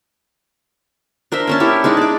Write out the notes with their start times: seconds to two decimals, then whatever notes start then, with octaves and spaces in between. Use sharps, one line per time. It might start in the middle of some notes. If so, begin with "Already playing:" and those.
1.32 D4 A#4 C5 E5
1.47 A#3 C#4 A5
1.60 E4 G4 C#5
1.84 G#3 D4 D#4 A5
1.97 D5 D6